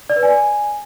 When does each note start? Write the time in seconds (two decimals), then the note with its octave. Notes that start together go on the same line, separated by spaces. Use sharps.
0.10 D5
0.16 B4
0.23 G#5